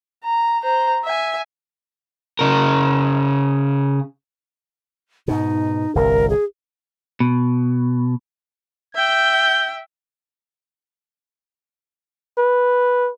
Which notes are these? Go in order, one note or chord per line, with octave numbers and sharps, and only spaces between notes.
A#5
C5 A#5
E5 G#5
C#3 A#4
G#2 B2 D#4
G1 C2 A#4
G#4
B2
E5 G5 G6
B4